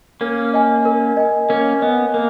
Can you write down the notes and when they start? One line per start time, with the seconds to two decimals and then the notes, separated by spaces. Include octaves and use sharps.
0.21 A#3 C#4 A#4
0.54 D#5 G#5
0.85 A#4
1.17 D#5 G#5
1.49 A#3 C#4 A#4
1.82 B3 D#5 G#5
2.14 A#3 A#4